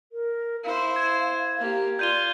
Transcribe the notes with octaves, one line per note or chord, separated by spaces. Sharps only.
A#4
E4 C5 F5
G#6
A#3 G4
F4 D5 G6 D#7 G7